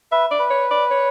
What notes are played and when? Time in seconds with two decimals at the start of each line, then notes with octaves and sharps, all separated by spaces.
0.12 B4 E5
0.31 D5
0.39 B4
0.50 C#5
0.71 D5
0.91 C#5